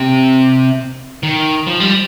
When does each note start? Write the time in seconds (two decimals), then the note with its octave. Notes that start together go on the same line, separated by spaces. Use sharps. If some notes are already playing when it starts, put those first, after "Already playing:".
Already playing: C3
1.23 D#3
1.67 F3
1.80 G3